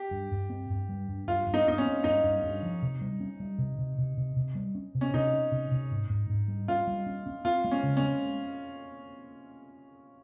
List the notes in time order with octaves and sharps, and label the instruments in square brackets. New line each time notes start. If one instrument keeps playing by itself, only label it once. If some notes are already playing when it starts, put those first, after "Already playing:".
Already playing: [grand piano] G4
[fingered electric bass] G2
G2
C4
G2
G3
G2
[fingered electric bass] G2 [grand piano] F4
[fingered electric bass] G2
[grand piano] D#4
[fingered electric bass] G2 [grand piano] D#4
[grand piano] C#4
[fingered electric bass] C4
[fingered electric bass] G2 [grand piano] D#4
[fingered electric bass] G2
G2
F3
C3
G3
C#4
G3
C3
C3
C3
C3
C3
G3
C#4
C3
[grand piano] C#4
[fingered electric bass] C3 [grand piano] D#4
[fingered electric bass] C#4
C3
C3
G#2
G#2
G#2
G3
[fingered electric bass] C#4 [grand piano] F4
[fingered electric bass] G3
C#4
C#4
[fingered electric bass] C4 [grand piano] F4
[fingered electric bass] G#3
[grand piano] C#4
[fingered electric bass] C#3
[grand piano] C#4
[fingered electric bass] G#3